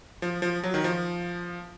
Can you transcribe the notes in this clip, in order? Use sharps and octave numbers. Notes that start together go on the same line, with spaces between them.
F3
F3
F#3
D#3
F3